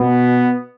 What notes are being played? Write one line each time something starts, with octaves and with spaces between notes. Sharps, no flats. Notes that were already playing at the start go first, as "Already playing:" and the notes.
Already playing: B2 B3